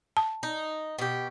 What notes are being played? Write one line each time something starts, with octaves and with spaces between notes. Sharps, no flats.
A5
D#4
B2 G4